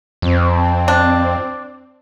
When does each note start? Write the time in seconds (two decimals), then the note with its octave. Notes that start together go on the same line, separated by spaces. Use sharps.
0.22 F2 C4
0.88 D4